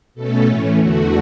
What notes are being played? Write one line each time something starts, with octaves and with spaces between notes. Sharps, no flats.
B2 A3 C#4 A4
A2 E3 A3 C#4
E2 D3 A3 F#4